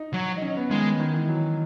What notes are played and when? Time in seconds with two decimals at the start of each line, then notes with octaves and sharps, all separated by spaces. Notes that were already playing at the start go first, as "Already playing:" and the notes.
Already playing: D#4
0.14 F#3
0.37 D#4
0.42 C#4
0.57 B3
0.71 D#3 G#3
1.00 D#3
1.14 E3
1.28 F#3